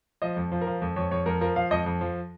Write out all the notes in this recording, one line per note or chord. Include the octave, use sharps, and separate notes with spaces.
F3 D#5
F2
F3
A#4
F3
F2
F2 C#5
F2 C#5
F2 A#4
F3 A#4
F3 F5
F2 D#5
F2
F3